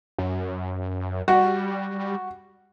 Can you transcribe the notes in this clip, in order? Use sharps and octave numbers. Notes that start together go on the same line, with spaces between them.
F#2
G3 F#4